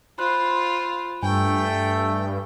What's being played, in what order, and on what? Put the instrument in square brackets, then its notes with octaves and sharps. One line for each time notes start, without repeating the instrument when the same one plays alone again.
[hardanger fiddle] F4 C5 [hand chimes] B5 F#6
[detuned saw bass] G2 [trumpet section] A3 [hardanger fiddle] G5 [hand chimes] G#5